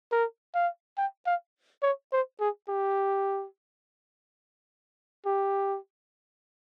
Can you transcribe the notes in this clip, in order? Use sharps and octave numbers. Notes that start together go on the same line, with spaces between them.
A#4
F5
G5
F5
C#5
C5
G#4
G4
G4